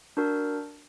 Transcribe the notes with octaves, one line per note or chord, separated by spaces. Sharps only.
D4 F#4 A#4